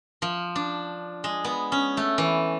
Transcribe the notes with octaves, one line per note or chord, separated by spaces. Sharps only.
F3
D4
G#3
B3
C#4
A3
E3